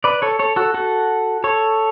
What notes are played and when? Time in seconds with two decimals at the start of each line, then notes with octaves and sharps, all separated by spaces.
0.04 B4 D5
0.22 A4 C#5
0.39 A4 C#5
0.56 F#4 A4
0.74 F#4 A4
1.44 A4 C#5